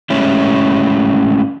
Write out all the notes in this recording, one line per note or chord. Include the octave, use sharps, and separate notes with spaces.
A2 G3 G#3 C#4 E4